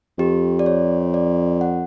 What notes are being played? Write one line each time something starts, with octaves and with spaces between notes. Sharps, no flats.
F2 G4
D5
C#5
D5
F#5